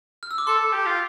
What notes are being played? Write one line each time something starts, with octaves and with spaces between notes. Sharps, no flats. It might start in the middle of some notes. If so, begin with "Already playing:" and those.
F6
E6
D6
A4 C6
A4
G4
F4